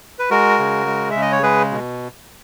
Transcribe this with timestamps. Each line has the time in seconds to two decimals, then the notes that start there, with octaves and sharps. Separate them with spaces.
0.19 B4
0.30 G#3 F#4 A#4
0.59 C#3
0.87 G#3
1.11 C#3 E5
1.22 D#5
1.32 C#5
1.43 G#3 G#4 B4
1.71 B2